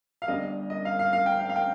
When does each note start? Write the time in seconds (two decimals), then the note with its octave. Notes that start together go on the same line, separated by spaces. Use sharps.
0.22 F5
0.28 G1 G2 G3 D#5
0.70 D#5
0.85 F5
0.99 F5
1.13 F5
1.26 G5
1.39 F5
1.49 F5
1.56 G5